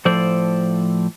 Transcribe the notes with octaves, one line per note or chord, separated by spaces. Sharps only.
A2 F3 A4 C5 D5